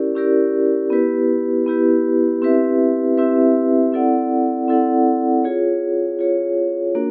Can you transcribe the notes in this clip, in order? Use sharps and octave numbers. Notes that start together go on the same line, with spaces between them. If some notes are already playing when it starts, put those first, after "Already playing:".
Already playing: C#4 E4 G4 A#4 D5
C#4 E4 G4 A#4 D5
B3 E4 G4 B4
B3 E4 G4 B4
C4 E4 G4 B4 E5
C4 E4 G4 B4 E5
C4 E4 A4 D5 F#5
C4 E4 A4 D5 F#5
F4 G#4 C#5
F4 G#4 C#5
A#3 D4 F#4 A#4